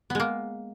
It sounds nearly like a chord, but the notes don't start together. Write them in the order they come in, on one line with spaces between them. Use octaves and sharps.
B3 G#3 A#3